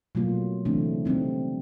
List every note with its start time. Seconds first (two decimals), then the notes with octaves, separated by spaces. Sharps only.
0.15 B2 F#3 A3 A#3 F4
0.65 C#3 E3 A3 C4 D4
1.05 G3 A3 C4 D#4